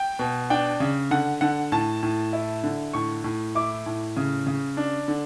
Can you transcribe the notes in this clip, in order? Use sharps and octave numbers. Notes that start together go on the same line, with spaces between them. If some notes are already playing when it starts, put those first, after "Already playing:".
Already playing: G5
B2
D4 G5
C#3
D3 F#5
D3 F#5
A2 A5
A2
E4
D3
A2 C#6
A2
E4 D6
A2
C#3
C#3
D4
D3